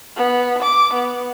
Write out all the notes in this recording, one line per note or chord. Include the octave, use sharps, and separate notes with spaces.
B3
D6
B3